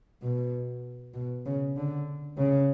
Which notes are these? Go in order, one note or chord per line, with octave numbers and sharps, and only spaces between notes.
B2
B2
C#3
D3
C#3